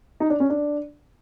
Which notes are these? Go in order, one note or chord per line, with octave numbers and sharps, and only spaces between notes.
D#4
D4
C#4
D4